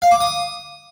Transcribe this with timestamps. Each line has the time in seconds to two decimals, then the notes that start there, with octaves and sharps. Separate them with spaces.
0.02 F5
0.11 D6
0.20 D#6